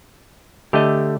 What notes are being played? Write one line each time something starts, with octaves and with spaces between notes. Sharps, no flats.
D3 A3 G4 D#5